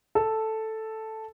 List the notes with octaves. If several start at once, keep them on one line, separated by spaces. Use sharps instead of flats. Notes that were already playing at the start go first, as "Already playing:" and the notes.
A4